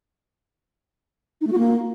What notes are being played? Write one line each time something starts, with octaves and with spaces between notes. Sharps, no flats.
D#4
A3
F#4
A#3